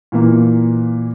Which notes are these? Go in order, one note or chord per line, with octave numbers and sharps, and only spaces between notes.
A#2 E3 A#3